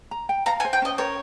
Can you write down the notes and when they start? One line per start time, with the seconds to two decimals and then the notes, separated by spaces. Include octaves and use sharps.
0.11 A#5
0.29 G5
0.46 F5 A#5
0.60 G#5
0.65 C5
0.73 G5
0.82 C#4 D#5
0.98 A#4 C#5